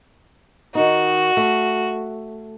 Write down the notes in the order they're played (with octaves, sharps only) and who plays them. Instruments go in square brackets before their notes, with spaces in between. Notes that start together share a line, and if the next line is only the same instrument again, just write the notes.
[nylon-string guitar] D#3 D#4 [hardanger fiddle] F#4
[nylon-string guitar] A3